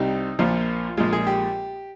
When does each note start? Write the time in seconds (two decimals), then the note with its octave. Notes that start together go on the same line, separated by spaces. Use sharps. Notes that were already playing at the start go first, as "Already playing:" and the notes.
Already playing: C2 C3 G3 D#4
0.39 A#1 A#2 F3 F4
0.97 A#1 A#2 G#3 F4
1.13 G#4
1.27 G4